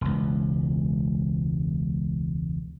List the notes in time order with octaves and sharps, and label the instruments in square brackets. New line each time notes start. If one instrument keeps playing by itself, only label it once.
[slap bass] E1 C#2